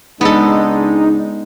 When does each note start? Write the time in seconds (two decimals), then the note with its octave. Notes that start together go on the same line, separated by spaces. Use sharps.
0.21 C#2 G#3 B3 D4 D#4 G#4 A4